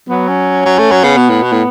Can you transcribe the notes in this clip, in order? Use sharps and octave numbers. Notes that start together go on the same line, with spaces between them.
F#3 B3
C#4
F#3
A3
F#3
C#3 B3
B2
A2
B2
A2